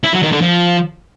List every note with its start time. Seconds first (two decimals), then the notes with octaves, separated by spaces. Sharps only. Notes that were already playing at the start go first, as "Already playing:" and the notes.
0.04 E4
0.13 F#3
0.23 D#3
0.32 D3
0.42 F3